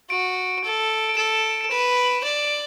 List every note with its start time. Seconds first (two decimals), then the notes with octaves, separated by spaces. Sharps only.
0.10 F#4 D7
0.64 A4
1.09 D7
1.17 A4 E7
1.61 D7
1.71 B4 E7
1.97 F#7
2.24 D5